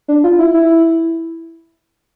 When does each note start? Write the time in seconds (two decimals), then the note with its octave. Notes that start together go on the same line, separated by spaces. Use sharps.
0.08 D4
0.24 F4
0.39 E4
0.54 E4